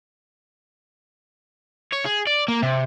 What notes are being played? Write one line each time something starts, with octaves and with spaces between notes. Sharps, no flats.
C#5
G#4
D5
A#3
C3